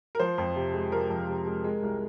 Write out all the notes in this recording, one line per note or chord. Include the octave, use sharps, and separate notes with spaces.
A#4
F3 C5
F2
C3
G#3
F3 A#4
F2
C3
G#3
G#3
C2